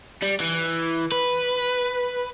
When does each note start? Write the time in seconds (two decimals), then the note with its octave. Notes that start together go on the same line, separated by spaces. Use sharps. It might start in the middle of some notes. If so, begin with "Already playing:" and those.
0.23 G3
0.40 E3
1.12 B4